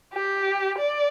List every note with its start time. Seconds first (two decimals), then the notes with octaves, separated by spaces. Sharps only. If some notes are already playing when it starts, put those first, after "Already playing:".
0.14 G4
0.78 D5